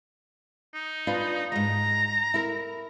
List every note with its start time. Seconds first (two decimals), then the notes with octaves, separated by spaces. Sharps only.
0.74 D#4
1.07 D4 F4 B4
1.52 E2 G#2 A#5
2.34 E4 A#4